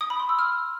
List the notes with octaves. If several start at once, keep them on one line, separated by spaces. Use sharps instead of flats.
D#6
B5
C6
E6
F6